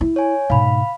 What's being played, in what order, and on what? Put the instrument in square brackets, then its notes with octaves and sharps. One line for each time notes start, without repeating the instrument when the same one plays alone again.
[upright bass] E4
[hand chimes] C#5 G#5
[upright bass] G#2 B2 [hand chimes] F5 B5